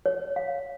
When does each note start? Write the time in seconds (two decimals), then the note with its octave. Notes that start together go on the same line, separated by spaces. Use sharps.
0.06 C#5
0.36 F5